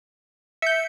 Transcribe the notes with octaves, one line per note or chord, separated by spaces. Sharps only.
E5 G6 C#7